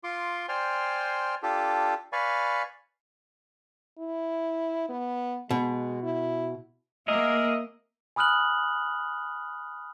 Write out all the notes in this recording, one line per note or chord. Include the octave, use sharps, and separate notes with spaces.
F4 C6 D6
C5 D5 G5 G#5 C6 F6
D4 F4 G4 A4
B4 D5 F5 G#5 B5 C#6
E4
B3
B2 G#3
E4
A#3 G#4 A#4 D#5 E5
G#5 B5 D#6 F6 F#6 F#7